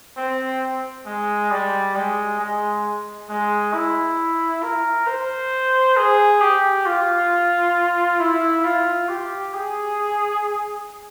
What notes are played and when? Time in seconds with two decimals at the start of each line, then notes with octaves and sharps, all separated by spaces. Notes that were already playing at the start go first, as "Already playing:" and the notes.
0.17 C4
1.06 G#3
1.51 G3
1.95 G#3
2.40 G#3
3.29 G#3
3.74 E4
4.63 A#4
5.07 C5
5.97 G#4
6.41 G4
6.86 F4
8.19 E4
8.64 F4
9.09 G4
9.54 G#4